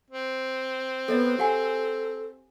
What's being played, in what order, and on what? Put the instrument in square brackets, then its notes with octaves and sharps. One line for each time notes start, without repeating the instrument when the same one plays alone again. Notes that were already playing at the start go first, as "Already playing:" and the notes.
[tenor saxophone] C4
[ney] B3 [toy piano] A4 C#5 D#5
[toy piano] G4 F#5 G#5 [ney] A4